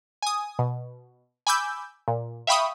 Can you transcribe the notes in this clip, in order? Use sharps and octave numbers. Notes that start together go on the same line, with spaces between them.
G#5 D#6
B2
G#5 B5 D6 E6 G6
A#2
E5 F5 G5 B5 C#6 D#6